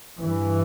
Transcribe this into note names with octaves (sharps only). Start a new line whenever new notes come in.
G2 E3